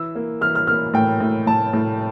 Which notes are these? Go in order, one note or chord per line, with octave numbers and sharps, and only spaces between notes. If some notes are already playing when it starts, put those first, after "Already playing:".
Already playing: E3 E6
A#3
E3 F6
F6
A#3 F6
A2 G5
A2
A2 A5
A2